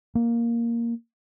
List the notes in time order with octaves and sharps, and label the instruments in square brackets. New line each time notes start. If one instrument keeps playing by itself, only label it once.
[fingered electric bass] A#3